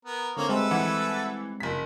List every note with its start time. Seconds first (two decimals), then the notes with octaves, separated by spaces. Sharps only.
0.05 B3 A#4
0.37 D3 A3 A#3 C4 C#5
0.49 G3 G#3 C4 A4 B4 E5
0.71 E3 F#5
1.60 F#1 B6